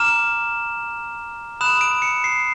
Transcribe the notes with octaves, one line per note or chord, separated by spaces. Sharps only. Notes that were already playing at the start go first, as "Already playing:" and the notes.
Already playing: A#5 D6 F6 E7
B5 D#6 F#6 E7
D7
C#7
C7